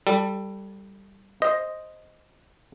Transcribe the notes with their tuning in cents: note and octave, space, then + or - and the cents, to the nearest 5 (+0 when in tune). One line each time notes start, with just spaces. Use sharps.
G3 +0 A4 +20
C5 +0 D#5 +0